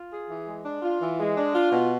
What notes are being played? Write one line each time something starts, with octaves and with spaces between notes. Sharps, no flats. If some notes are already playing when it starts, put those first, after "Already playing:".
Already playing: F4
G#4
E3
G#3
D4
F4
E3
G#3
D4
F4
B2